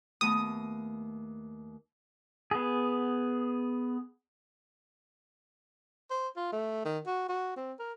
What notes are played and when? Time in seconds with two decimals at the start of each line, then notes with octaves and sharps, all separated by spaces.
0.21 D#2 A3 B3 D#6
2.51 B3 G#4
6.11 C5
6.37 F4
6.53 A3
6.85 D#3
7.07 F#4
7.29 F#4
7.57 C4
7.79 A#4